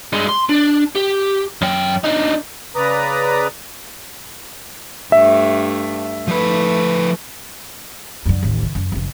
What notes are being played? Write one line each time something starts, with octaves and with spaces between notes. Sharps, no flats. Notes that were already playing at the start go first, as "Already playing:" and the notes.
G2 G#3
C6
D4
G4
F#2 G5
D4 D#4
C#3 B4 D5 A#5 D#6
G2 A3 E5
F3 A3 B4
F#2 D3
A1 D#2
C#3
F#2
F#1 F3